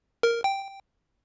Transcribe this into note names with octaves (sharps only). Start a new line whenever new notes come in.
A#4
G5